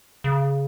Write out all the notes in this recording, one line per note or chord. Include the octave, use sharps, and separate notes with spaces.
C#3